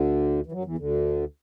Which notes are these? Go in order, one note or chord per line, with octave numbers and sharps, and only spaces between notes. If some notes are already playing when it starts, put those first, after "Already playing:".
Already playing: D2 D3
E3
F#2 F#3
E2 E3
D2 D3